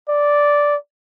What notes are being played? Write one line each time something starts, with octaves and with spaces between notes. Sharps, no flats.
D5